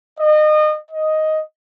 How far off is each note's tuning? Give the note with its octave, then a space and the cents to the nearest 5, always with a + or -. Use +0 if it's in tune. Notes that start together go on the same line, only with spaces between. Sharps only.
D#5 -30
D#5 +5